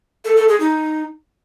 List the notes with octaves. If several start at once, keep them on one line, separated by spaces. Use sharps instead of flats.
A4
A4
G#4
D#4